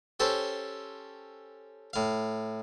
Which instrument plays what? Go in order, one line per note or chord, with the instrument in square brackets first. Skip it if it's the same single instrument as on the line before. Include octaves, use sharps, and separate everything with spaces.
[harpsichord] C#4 G4 A4 C5
A2 F5